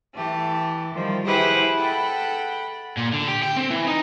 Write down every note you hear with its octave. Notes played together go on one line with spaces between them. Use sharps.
E3 A3 G4
D#3 F3 G3
E4 G4 G#4 B4 C5 F#5
A4 F#5 G5 B5
A#2
D3
G4
G5
C4
E3
D#4